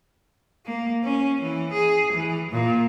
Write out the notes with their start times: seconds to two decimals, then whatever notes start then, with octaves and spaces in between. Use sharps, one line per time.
0.65 A#3
1.04 C#4
1.41 E3
1.72 G#4
2.13 E3
2.52 A#2